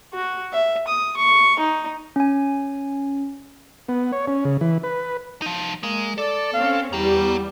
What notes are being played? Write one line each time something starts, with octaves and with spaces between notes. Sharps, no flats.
F#4
E5
D#6
C#6
D#4
C#4 G#5
B3
C#5
C#4
C#3
E3
B4
F3 D#4
G#3 A#3
A4 D5
C4 C#4 F5
E2 G3 G4 F#5 A#5